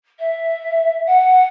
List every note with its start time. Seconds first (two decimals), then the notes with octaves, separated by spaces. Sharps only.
0.19 E5
1.06 F#5